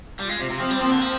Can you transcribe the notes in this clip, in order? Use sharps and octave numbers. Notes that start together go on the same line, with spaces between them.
G3 F4
G#3
C3
C3 C4
F3
G3
F3 A#3
D3
F3